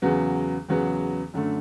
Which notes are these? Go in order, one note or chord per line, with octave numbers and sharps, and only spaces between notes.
E2 C#3 F#3 B3
E2 C#3 F#3 B3
F#2 D3 A3